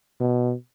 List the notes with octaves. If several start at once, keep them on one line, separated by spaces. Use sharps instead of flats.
B2